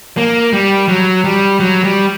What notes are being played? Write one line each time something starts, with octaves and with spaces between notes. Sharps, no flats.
A#3
G3
F#3
G3
F#3
G3